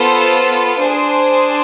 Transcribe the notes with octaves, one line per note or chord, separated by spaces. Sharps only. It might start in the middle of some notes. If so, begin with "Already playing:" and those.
Already playing: B3 F4 A4 C5
D4 G#4 C5